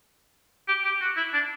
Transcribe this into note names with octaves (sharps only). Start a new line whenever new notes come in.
G4
G4
F#4
E4
D4